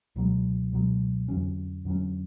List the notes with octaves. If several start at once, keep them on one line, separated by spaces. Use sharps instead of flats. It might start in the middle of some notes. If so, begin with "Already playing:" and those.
C#2 B2 F#3
C#2 B2 F#3
F2 D3 F#3 C#4
F2 D3 F#3 C#4